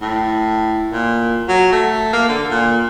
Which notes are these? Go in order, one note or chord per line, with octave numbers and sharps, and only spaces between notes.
A2
A#2
F#3
A3
A#3
D3
A#2